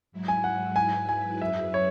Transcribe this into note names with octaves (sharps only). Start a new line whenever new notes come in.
G#2 F#3 E4
G#5
F#5
G#2 F#3 E4 B4 G#5
G#5
F#2 F#3 E4 G#4 B4 E5
C#5